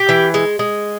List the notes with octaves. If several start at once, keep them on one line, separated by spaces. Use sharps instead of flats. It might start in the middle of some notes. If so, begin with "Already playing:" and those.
Already playing: G4
E3
G#3
G#3